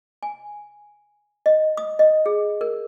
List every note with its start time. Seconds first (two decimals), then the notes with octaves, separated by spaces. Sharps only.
0.23 G#5
1.46 D#5
1.77 D#6
1.99 D#5
2.26 G#4
2.61 A#4